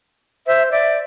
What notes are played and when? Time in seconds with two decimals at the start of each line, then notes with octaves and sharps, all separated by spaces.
0.47 C5 E5
0.71 D5 E5